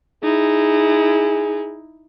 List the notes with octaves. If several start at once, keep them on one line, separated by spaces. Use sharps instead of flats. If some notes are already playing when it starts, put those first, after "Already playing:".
D#4 E4 G#4